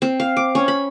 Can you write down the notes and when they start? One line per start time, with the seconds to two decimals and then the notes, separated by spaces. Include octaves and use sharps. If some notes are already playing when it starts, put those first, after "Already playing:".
0.02 C4
0.20 F5
0.37 D6
0.55 C#4
0.68 B5